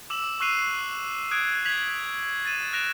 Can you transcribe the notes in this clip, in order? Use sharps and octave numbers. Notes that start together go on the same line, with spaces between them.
D6 E6 E7 F#7
C#6 E6 F#6 C7 D#7 F7
D#6 F#6 G#6 D7
G#6 B6 F7 F#7
A6 D#7 E7
F#6 A#6 D7 E7 F7